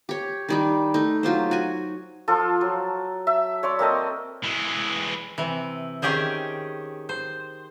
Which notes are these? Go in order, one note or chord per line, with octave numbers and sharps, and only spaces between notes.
G4 C#5
D#3 G3 D#4
A3 D#4
F#3 F4 G4 C5
F#4 G#5
F3 F4 A4
F#3
E5
C#5 D5 C6
A#3 C4 A4 D#5
E3 G#3
C3 E3
D#3 C#4 G4 G#4 C5
C5